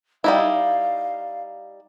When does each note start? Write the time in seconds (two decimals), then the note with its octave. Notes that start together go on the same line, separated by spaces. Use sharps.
0.24 G3 D#4 E4 F5